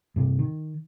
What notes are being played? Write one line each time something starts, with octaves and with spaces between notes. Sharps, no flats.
G2 C3
D#3